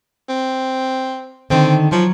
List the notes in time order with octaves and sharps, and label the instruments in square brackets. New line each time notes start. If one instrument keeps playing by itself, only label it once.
[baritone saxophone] C4
[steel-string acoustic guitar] D3 D#3 [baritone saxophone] C4
[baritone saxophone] F3 [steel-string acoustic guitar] F#3